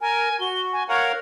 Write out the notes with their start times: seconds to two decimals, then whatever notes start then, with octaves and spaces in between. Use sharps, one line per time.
0.01 A#4 G#5
0.41 F#4 G7
0.73 G#5
0.89 A#4 C#5 F5 F#5